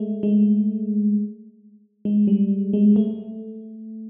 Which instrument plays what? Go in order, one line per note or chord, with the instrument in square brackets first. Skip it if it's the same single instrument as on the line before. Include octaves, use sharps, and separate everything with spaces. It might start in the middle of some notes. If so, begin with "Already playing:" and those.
Already playing: [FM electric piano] G#3 A3
G#3
G#3
G3
G#3
A3